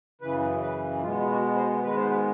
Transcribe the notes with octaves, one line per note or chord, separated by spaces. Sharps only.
F#2 C#3 E3 B4
B4
B2 G#3 B3 F4
F#4
C5
G#2 D#3 G#3 B3 B4
C5
B4